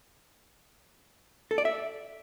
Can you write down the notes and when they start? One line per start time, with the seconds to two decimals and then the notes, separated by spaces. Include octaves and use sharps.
1.51 A4
1.58 D5
1.65 E5